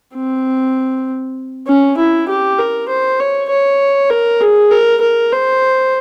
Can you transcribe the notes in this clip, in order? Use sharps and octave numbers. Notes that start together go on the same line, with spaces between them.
C4
C#4
E4
G4
A#4
C5
C#5
C#5
A#4
G#4
A#4
A#4
C5